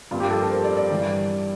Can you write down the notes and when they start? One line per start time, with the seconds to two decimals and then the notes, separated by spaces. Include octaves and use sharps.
0.11 G2 F3 A#3 F4
0.20 G4
0.31 A4
0.41 A#4
0.50 C5
0.64 D5
0.77 D5
0.90 G2 E3 G3